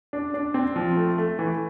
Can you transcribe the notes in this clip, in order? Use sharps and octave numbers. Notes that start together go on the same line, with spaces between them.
D4
D4
C4
F3
A3
A3
E3